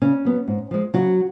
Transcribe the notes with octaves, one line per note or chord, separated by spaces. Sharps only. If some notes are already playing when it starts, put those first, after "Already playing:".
C#3 C#4
F#3 B3
G#2
F3 G#3
C#3 F#3 F#4